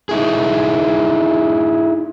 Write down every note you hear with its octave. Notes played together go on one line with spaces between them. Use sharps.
D#4 E4 G#4